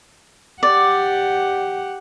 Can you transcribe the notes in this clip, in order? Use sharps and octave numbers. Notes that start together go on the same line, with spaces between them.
G4 D5 F#5